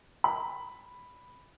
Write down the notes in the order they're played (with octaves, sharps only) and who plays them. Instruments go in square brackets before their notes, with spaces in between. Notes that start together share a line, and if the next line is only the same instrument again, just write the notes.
[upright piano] B5